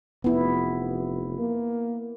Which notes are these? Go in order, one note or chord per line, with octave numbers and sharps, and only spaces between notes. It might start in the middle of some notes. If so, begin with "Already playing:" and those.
F1 B3 E4
A#3